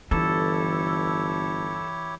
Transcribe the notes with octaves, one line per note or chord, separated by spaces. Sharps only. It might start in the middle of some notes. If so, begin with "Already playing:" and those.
G1 E3 E4 G4 A4 C#5